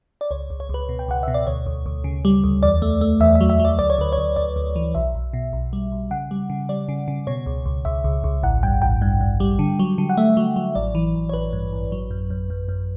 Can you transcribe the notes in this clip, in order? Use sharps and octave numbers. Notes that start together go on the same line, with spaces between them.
D5
C#2 C#5
C#2
C#5
C#2 B4
B2
G5
C#2 F#5
B2 E5
D5
D2 C#5
D2
D2
C#3
G3
D2
E2 D5
A3
A3
E2 E5
E5
F#3
E5
F#3
D5
D2 D5
C#5
D2 B4
C#5
D2
D2 D5
D2
E3
B1 E5
B1
B2
B1
G3
B1
C#3 F#5
G3
C#3
G3 D5
C#3
C#3
B2 C#5
C#2
C#2
C#2 E5
C#2
C#2
A1 F#5
G2 G5
A1 G5
G2
G2
G3
D3
F#3
D3
F#5
A3 E5
F#3
F#3
A1 D5
E3
A1
C#5
A1 B4
G2
A1
F#3
F#2
F#2
F#2
F#2